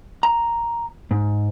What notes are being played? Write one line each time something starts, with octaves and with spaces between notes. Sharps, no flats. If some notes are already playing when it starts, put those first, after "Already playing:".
A#5
G#2